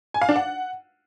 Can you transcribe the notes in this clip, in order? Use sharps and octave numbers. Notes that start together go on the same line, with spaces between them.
G#5
F5
D4
F#5